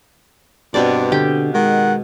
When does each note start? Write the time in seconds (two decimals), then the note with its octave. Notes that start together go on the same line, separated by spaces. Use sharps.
0.74 G2 B2 C4 D5
1.12 D3 G4 G5
1.54 D#3 G#3 F#5